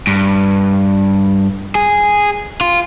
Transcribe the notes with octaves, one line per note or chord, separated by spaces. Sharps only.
G2
G#4
F4